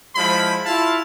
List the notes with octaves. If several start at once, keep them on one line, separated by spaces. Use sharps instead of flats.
F3 G#3 E4 B5
E4 F4 F5 A5